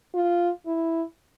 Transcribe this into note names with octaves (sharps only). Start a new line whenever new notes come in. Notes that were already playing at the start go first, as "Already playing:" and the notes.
F4
E4